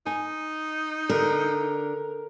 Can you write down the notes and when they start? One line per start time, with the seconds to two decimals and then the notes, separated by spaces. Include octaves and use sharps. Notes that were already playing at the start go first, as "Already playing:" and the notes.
0.06 D#4 G#5
1.09 D3 A#4